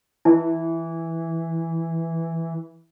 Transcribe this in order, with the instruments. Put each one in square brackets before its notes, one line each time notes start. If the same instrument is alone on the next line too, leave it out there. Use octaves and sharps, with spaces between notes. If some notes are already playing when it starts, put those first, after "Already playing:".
[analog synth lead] E3 [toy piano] E4